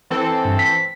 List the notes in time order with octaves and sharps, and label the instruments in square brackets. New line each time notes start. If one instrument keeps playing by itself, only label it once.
[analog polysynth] E3 C4 A4
[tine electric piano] G2
B6